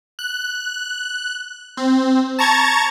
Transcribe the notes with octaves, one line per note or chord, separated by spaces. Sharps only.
F#6
C4
A5 A#5 C#6 G#6 A6